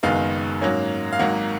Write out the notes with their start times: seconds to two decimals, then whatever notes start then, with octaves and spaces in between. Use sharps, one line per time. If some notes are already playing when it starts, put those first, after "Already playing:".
0.03 F#1 F#2 D#3 G#3 B3 F5
0.61 G#2 F#3 A#3 C#4
1.13 F5
1.19 G#1 G#2 F#3 A#3 F#5